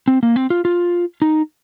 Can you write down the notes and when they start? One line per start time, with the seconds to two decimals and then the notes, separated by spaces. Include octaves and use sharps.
0.08 C4
0.23 A#3
0.36 C4
0.50 F4
0.65 F4
1.22 D#4